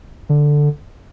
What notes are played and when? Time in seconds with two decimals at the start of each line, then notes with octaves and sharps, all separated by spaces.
0.29 D3